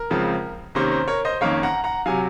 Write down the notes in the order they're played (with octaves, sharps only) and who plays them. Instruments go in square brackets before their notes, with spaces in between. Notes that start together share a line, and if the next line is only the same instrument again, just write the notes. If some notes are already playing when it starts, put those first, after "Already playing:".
Already playing: [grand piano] A#4
C#2 C#3 F3 C4
C3 D#3 A#3 C#4 C5
C5
A#4 C#5
C5 D#5
F2 D#3 A#3 C#4 C#5 F5
F#5 A#5
F#5 A#5
C3 F#3 F5 G#5